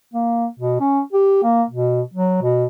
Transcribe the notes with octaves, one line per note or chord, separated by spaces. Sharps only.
A#3
B2
C#4
G4
A#3
B2
F#3
B2